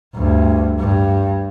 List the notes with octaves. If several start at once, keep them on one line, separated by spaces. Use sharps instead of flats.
D2 G2
G2